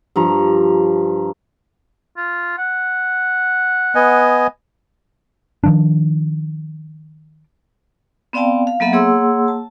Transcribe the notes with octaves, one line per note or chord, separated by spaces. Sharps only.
G2 F3 A#5 C#6
F4
F#5
B3 D#5 G#5
D#3 F3 D4
B3 C4 D5 F5 G5 A5
F5
F#3 A#3 B3 A4 E5 F#5
A#3 G#4 C#5 F#5 C6 E6
A5